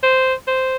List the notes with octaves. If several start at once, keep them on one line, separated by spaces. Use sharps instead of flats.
C5
C5